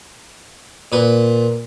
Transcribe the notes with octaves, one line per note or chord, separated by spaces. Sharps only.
A#2 B4